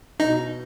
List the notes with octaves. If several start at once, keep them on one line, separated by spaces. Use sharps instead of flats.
B2 D#4